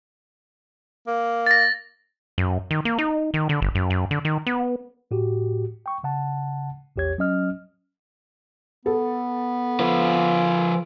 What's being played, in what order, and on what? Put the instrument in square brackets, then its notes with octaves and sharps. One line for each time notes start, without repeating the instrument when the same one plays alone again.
[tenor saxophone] A#3
[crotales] A6 A#6
[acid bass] F#2
D#3
A#3
D#4
D#3
D3
G1
F#2
F#2
D3
D#3
B3
[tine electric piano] A2 F#4 G4
G5 C#6
C#3 F#5 A5
A#1 E2 G4 C#5 G#6
F#3 C#4 D#5 F6
[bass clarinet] B3 [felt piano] A4
[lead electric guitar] F3 B4 [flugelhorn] F4